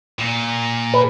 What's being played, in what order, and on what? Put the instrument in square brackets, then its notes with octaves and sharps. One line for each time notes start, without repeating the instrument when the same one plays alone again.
[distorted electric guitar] A#2
[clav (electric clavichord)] B4